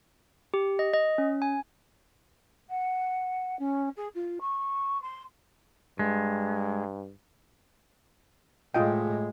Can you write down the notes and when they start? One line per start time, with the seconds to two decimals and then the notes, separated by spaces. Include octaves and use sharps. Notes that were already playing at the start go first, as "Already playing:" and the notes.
0.54 G4
0.79 D#5
0.93 D#5
1.18 C#4
1.42 G#5
2.69 F#5
3.59 C#4
3.96 G#4
4.15 F4
4.41 C#6
5.02 C6
5.99 G2 G#3
8.74 A2 G#3 F4 D#5 G5